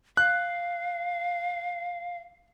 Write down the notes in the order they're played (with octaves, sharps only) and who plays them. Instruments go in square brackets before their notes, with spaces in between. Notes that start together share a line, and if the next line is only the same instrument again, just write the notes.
[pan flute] F5 [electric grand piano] F#6